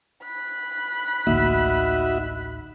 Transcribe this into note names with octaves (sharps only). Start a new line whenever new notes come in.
B5 F#6
A1 D2 A#3 D#4 F#4 E5